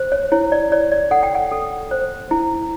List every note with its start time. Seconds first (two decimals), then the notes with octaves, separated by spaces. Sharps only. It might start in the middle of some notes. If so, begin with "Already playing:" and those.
Already playing: C5
0.12 C#5
0.32 E4 C#5
0.52 D5
0.72 C#5 D5
0.92 D5
1.11 A4 F#5
1.23 G5
1.35 F#5
1.52 A4
1.91 C5
2.31 E4